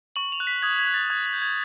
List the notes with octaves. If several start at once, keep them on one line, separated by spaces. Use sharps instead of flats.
C#6 F#7
F7
F#6
B6
D#6 G#6
G#6
F#6
A6
D#6 G#6
G#6
G6
G#6